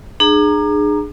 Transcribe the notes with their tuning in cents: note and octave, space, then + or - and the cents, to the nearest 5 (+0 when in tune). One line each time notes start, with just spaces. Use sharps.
D4 +40 G#4 +0 A#5 -5